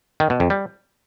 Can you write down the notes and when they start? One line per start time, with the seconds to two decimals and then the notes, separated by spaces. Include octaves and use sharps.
0.20 D#3
0.30 B2
0.40 F2
0.50 G3